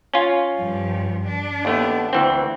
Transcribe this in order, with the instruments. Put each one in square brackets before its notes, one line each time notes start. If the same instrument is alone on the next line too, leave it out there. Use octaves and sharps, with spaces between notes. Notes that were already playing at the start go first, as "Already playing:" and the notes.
[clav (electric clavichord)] C#4 F4
[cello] G2 F3
D4
[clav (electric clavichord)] D#2 A3 B3
D2 E3 C4